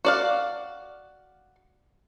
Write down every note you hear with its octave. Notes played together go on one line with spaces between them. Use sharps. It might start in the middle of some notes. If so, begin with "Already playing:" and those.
F#4 D5 F5